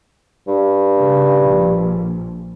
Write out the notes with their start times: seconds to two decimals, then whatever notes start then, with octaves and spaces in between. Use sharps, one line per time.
0.48 G2
0.96 C#3
1.40 A#1